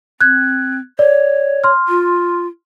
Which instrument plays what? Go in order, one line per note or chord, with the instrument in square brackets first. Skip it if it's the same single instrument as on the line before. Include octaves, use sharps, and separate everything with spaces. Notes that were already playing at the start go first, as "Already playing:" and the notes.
[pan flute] C4 [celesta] F#6 G#6
[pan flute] C#5 [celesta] D5
[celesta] C6 F6
[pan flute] F4